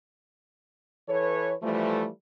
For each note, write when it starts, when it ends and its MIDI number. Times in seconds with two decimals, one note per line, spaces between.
1.09 1.53 52
1.09 1.53 69
1.09 1.53 71
1.09 1.53 73
1.63 2.08 52
1.63 2.08 53
1.63 2.08 55
1.63 2.08 57